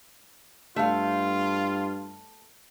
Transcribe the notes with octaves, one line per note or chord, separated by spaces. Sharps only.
G2 A3 F4 F5